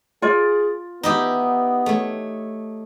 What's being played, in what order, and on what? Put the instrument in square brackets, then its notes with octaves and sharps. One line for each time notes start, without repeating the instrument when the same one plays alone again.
[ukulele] F4 D5 [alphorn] G#4
[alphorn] B3 [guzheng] D#4 E4 G4
[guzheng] A3 C#5